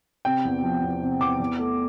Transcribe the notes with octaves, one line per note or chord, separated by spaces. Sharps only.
C3 G5
E2
F3
E2
C3
E2 D6
E2
A3